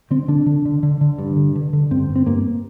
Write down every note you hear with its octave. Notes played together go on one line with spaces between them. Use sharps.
D3 C4
D3 D4
D3
D3
D3
D3
G2
D3
D3
D3
G2 C4
G2
C4
G2 A#3